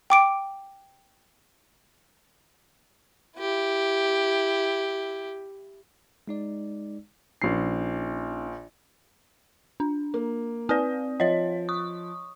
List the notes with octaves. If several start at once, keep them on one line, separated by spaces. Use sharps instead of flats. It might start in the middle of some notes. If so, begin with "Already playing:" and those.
G5 D6 D7
E4 G4
G#3 D#4 D5
A#1 C#4 D#4 C7
D4
A#3
C4 B4 D5 D#6
F3 C#5 D#5
C#6 D#6